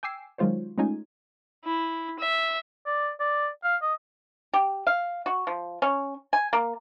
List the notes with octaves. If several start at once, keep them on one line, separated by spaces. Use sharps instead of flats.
G5 G#5 D6 E6 C7
D#3 F#3 G#3 F4 C5 C#5
G#3 A3 C#4 D#4 F4 G#5
E4
E5
D5
D5
F5
D#5
G4
F5
F#4
F3
C#4
G#5
A#3